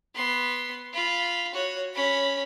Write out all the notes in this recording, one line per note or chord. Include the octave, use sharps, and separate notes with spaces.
B3 C6
F4 B5
F#4 C#5
C#4 B5